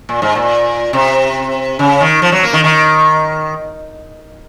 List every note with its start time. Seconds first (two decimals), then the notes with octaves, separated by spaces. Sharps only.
0.09 A#2
0.22 G#2
0.35 A#2
0.93 C3
1.79 C#3
2.00 D#3
2.22 F3
2.32 F#3
2.43 A#3
2.53 D#3
2.64 D#3